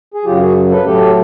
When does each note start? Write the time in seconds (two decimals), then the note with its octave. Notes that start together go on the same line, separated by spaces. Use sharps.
0.14 G#4
0.25 F#2 C#3 F#3 F4 G4
0.40 F#4 G#4
0.70 A4 B4
0.85 A2 F#3 A3 G4 A4